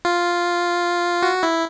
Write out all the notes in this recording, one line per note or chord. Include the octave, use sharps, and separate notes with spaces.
F4
F#4
E4